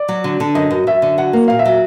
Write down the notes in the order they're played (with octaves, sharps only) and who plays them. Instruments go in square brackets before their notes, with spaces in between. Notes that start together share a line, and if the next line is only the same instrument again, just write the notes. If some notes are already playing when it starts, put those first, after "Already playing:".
Already playing: [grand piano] D5
[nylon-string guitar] F#3
D3
D3
[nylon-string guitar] F#2 [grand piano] D#5
[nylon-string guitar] F#2
[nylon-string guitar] F#2 [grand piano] E5
[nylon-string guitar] D3
[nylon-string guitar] F#3 [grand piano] F#5
[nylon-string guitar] A#3
[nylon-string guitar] A#2 [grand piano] F5
[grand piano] E5
[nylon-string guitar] F#3